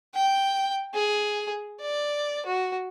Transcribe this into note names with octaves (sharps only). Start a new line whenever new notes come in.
G5
G#4
D5
F#4